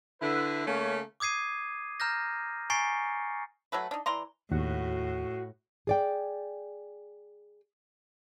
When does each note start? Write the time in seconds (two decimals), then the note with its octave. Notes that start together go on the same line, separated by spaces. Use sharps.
0.21 D3 E4 B4
0.67 C#3 A3 A#3 C#4
1.20 D6 D#6 G#6 C7 D#7
2.00 A#5 F6 G6 A#6
2.70 G#5 A#5 C#6 A6 C7 C#7
3.72 F#3 A3 A4 B4
3.91 D4 D#4
4.06 E3 D5 A#5 C6
4.51 D#2 A2 F#4
5.87 G#4 D5 G5